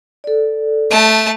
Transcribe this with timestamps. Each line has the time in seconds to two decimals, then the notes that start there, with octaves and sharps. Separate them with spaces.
0.24 A4 D5
0.90 A3 A5